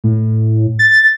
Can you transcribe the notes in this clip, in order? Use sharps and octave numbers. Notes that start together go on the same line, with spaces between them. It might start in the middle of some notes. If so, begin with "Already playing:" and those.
A2
A6